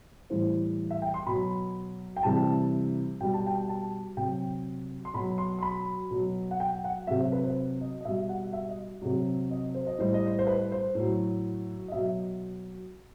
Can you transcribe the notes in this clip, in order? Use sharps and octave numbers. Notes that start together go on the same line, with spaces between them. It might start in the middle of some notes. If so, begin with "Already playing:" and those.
A2 E3 G3 C5
E5
G5
C6
B2 F#3 B5
G5
C3 E3 G3 A5
B2 G3 G5
A5
G5
G5
A5
C3 F#3 G5
C6
B2 F#3 B5
C6
C6
B5
B2 F#3
F#5
G5
F#5
C3 F#3 E5
C5
B4
C5
D#5
D#5
B2 G3 E5
F#5
E5
D#5
C3 F#3
D#5
C5
D#5
A2 G3 C5
D#5
C5
C5
B4
C5
A2 F#3
D#5
B2 F#3 E5